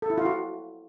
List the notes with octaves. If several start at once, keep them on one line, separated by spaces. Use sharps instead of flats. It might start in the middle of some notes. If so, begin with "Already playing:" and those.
A4
E4
F4
F#4